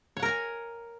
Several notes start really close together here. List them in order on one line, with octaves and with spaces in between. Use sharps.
C#5 F#5 A#4 A#5 G#5